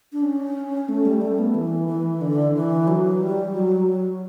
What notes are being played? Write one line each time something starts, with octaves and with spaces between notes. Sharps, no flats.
D4
C#4
A3
G3
A3
B3
E3
E3
D3
E3
F#3
G3
F#3